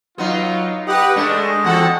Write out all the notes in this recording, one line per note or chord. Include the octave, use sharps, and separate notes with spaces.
F#3 B3 D#4 F4
G4 B4 D#5 F#5
G#3 A3 D4
E2 F#4 A4 F#5